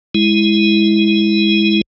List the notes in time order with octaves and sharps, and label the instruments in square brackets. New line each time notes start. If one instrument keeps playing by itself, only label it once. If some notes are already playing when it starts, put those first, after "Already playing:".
[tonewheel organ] G#3 E4